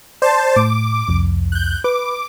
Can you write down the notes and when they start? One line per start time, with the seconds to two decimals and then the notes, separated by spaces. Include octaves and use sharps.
0.22 C5 D5 A5
0.56 A2 D6
1.08 C2 F2
1.52 F#6 G6
1.84 B4 D6